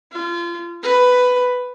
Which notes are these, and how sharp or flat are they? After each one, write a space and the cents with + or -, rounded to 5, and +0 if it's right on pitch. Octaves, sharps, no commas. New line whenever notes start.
F4 -30
B4 +10